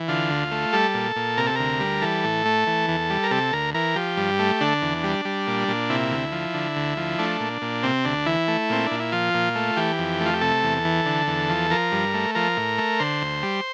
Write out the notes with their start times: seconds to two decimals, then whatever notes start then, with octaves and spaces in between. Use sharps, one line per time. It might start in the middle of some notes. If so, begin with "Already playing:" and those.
Already playing: E3
0.08 D3 F4
0.30 D2
0.51 A3
0.73 G3 A4
0.94 A#2
1.16 A#2
1.37 C3 A#4
1.47 A4
1.56 D2 A#4
1.80 G3
2.02 E3 A4
2.24 A2
2.45 A3
2.67 E3
2.88 E2
3.10 G3
3.23 A#4
3.31 C3 A4
3.53 D2 A#4
3.74 E3 A#4
3.96 F3 G4
4.17 G2
4.39 A3
4.61 D3 D4
4.82 E2
5.04 G3
5.25 G3
5.47 A#2
5.68 A#2
5.90 C3 E4
6.11 D2
6.32 F3
6.54 D3
6.76 D2
6.97 F3
7.18 A3 D4
7.40 A#2
7.62 A#2
7.83 C3 C4
8.05 D2 D4
8.26 E3 E4
8.48 A3
8.70 A#2 C4
8.86 A#2 D4
9.00 E4
9.12 F3 F4
9.34 A#2
9.55 A3
9.76 E3 G4
9.98 F2
10.20 A3
10.26 F4
10.34 G4
10.41 C3 A4
10.63 E2
10.85 E3
11.06 D3
11.28 E2
11.49 F3
11.71 F3 A#4
11.92 G2
12.14 A3
12.35 F3 A#4
12.57 A2
12.78 A3
13.00 D3 C5
13.22 D2
13.43 G3